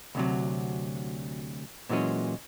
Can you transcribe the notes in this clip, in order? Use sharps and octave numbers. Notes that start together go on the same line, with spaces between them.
D2 C3 F#3
A#2 E3 F#3 G#3 C#4